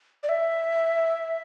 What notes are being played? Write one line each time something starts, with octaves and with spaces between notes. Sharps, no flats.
D5
E5